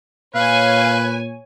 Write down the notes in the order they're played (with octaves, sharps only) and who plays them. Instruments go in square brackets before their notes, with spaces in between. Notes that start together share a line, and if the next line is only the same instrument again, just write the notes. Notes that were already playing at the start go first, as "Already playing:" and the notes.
[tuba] A#2 [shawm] B4 [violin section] C#5 G#5 [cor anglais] F5